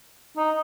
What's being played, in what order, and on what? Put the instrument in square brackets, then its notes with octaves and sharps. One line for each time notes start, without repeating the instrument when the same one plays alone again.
[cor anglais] D#4